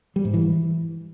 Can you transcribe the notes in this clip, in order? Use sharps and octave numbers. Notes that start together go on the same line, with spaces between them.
G3
G#2
E3